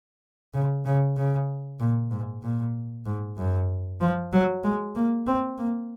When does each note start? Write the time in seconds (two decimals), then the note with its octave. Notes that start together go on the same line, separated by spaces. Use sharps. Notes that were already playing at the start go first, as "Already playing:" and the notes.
0.54 C#3
0.85 C#3
1.17 C#3
1.80 A#2
2.11 G#2
2.43 A#2
3.06 G#2
3.37 F#2
4.01 F3
4.33 F#3
4.64 G#3
4.95 A#3
5.27 C4
5.58 A#3